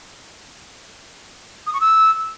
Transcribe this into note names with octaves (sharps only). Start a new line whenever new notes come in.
D#6
C#6
E6